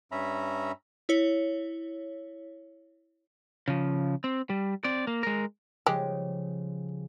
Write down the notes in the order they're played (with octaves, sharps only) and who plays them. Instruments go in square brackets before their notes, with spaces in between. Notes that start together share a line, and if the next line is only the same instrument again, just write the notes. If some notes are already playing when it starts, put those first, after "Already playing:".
[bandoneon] G2 C#4 E5 A#5 B5
[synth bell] E4 C#5
[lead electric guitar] C#3 F3
C4
G3
C4 D5
A#3
G#3 A#4
[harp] C#3 F3 G3 [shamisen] G#3 G4